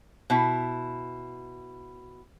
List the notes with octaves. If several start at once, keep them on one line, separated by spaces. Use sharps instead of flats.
B2 E4